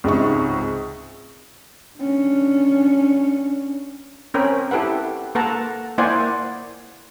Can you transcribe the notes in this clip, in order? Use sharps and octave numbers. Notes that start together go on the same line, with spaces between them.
C#2 G#2 C3 C#6
C#4 D4
C4 C#4 A#4 G5 B5
E4 G4 A4 B4 F#5
A#3 A4 B4 F#5 A5 A#5
A#3 E4 C5 D5 F#5 G#5